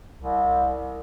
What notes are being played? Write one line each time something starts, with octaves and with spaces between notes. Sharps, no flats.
C2